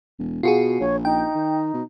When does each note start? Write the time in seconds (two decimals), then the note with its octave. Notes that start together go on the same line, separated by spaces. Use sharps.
0.19 E1
0.43 B2 F4 F#4 G#4
0.80 A#1 C#5
1.05 D#4 G5
1.34 D#3
1.74 B2